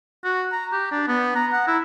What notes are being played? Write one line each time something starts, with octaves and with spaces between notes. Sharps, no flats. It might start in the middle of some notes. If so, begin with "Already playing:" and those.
F#4
A#5
G4
D4
B3
A#5
F#5
E4